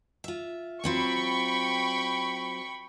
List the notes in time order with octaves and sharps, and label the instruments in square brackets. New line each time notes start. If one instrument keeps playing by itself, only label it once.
[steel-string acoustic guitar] F4 E5
[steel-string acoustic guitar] F#3 C4 F4 [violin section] G5 B5 C#6